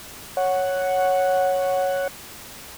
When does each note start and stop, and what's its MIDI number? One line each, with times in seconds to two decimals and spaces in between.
0.37 2.08 73
0.37 2.08 78